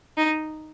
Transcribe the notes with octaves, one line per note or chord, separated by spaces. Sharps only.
D#4